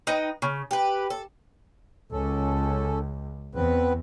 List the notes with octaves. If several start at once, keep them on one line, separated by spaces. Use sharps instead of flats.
D#4 B4 D#5 G5
C#3
G4 B4
A4
C#2 C#4 A4
E2 B3 C4 B4